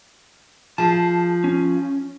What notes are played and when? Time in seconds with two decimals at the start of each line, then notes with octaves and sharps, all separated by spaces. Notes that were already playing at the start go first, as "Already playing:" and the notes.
0.78 F3 G#4 A5
1.44 C#4